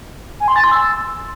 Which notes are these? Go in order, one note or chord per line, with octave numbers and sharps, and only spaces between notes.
G#5
C6
A6
C6
E6